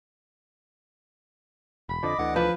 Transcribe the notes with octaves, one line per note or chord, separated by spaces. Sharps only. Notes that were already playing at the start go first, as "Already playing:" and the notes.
E1 B5
F2 D3 F3 D5 D#5 D6
D2 D3 E3 F#5
F3 B4